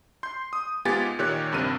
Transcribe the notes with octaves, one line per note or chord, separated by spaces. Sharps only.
C6 G6
D#6
G#2 B3 F4 G4 G#5 A6
A#2 D#3 G4 C#5 F#6
A#1 G2 C3 A#4 D#7